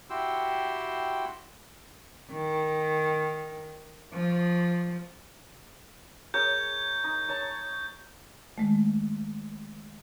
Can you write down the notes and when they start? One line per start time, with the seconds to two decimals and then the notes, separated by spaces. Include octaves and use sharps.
0.10 E4 F#4 G4 G5 C6 E6
2.31 D#3
4.13 F3
6.34 G#4 A#4 C#5 G6
7.04 D#4
7.29 C#5 A5 A#5
8.58 D#3 G#3 A3